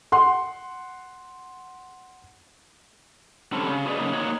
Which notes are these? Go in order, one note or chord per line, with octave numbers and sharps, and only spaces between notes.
F#5 C6
D3 G3 C4 C#4 A4
C#3
F#4 G#4 B4 C5 D5 D#5
F#2 C#3 A#3 D#4
A#3 D#4 F#4 C#5 F#5